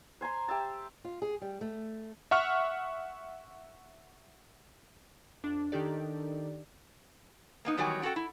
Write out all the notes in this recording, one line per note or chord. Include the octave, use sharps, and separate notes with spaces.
C5 G#5 A#5 C6
G4 E5 A5
F4
G#4
G3
A3
E5 F#5 C#6 F6
F2 D4
D#3 D4 D#4 G4 A4 D5
A#3 B3 D#4
E2 D#3 F#3 G3 C#5 G#5
C#4 F#4 G4 A4 G5
E4